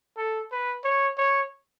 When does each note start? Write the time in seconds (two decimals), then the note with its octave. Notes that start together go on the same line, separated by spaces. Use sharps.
0.17 A4
0.52 B4
0.84 C#5
1.18 C#5